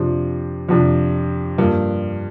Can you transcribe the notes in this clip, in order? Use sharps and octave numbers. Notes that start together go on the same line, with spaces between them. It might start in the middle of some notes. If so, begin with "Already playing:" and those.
Already playing: F2 C3 F3 D4
F2 C3 F3 D4
G2 F3 A#3